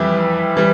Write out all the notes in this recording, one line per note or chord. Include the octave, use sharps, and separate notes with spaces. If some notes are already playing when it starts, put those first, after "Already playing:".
Already playing: F2 E3 G3 E4 G4
E3 G3